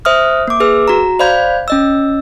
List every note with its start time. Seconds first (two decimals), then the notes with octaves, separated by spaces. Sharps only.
0.05 C5 E5 D#6 F6
0.48 A#3 D6
0.60 G#4 B4 E6
0.88 F#4 A#5
1.19 C5 D5 F5 B5 G6 G#6
1.68 C#4 D#5 E6